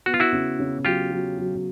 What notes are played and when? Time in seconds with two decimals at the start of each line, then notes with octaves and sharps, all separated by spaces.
0.06 B3 F#4
0.14 F4
0.20 E4 F#4
0.32 C#3
0.59 C#3
0.85 F#3 F4 G4
1.12 F#3
1.38 F#3